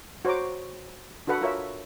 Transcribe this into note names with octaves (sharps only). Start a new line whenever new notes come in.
F#4 C5 C#5 A#5 D6
D4 F#4 A4 B4 F#5
F4 A#4 C#5 E5